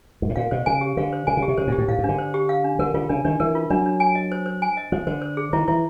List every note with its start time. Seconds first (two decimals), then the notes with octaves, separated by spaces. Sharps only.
0.22 G#2
0.29 A2
0.36 A#2 F5
0.51 B2 C5
0.66 C#3 G#5
0.81 G4
0.97 D3 F5
1.13 C5
1.27 C#3 G#5
1.37 C#3
1.43 G4
1.48 C3
1.58 C#3 C5
1.67 A#2 G4
1.78 A2
1.88 A2 F5
1.99 G#2
2.04 D3 D4
2.18 C5
2.34 G4
2.49 F5
2.64 D4
2.79 D3 A#4
2.94 D3 F4
3.09 C#3 D4
3.25 D#3 D4
3.40 E3 A#4
3.55 F4
3.70 F#3 D4
3.86 D4
4.00 G#5
4.15 D#5
4.32 C5
4.46 C5
4.62 G#5
4.77 D#5
4.92 F3 C5
5.07 D3 C5
5.22 C5
5.37 G#4
5.53 D#3 E4
5.68 E3 E4